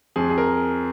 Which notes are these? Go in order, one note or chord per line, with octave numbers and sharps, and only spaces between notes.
F2 G#4
G#4
A#4